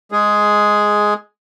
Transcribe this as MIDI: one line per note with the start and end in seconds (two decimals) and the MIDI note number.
0.12 1.14 56
0.12 1.14 68